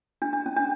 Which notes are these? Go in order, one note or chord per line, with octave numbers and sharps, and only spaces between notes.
D4
D4
C#4
D4